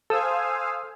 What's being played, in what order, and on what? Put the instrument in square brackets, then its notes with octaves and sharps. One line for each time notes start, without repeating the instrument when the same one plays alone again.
[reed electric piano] A4 [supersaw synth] C5 F5 G#5 [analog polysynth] D#6 E6